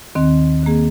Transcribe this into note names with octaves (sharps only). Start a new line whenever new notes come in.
D#2 D#3 C4
D#3 A#3 G#4